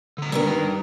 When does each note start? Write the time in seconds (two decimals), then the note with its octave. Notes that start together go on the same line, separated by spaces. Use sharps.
0.18 D3 A#5
0.32 D#3 G3 B3 D4 A#4